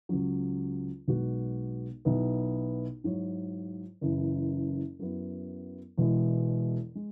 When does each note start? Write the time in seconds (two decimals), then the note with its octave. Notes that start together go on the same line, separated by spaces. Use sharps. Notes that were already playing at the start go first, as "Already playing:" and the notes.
0.09 C#2 C#3 F#3
1.08 B1 B2 G#3 B3 F#4
2.05 B1 B2 B3 E4
3.04 G#2 F#3 E4 C#5
4.01 F#1 F#2 C#3 E3
4.99 F#2 F#3 B3 E4
5.97 E1 E2 B2 G#3 E4
6.95 G#3